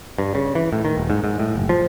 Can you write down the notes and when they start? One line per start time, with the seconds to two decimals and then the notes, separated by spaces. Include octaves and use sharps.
0.18 G2
0.35 C#3
0.55 E3
0.73 A2
0.85 D#3
0.97 D#1
1.10 G#2
1.24 G#2
1.40 A2
1.56 F#1
1.69 F3